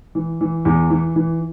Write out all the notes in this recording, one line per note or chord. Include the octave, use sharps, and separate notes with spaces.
E3
E3
E2
E3
E3